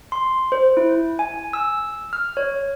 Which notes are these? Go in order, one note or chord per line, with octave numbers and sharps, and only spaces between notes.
C6
C5
E4
G#5
E6
F6
C#5